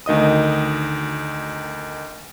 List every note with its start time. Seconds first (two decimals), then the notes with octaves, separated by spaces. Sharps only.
0.06 D2 D#3 D#5 D#6